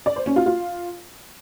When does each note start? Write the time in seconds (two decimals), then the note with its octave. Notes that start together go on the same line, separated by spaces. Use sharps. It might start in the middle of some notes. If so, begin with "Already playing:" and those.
0.06 D5
0.16 C5
0.26 C#4
0.36 F4
0.46 F4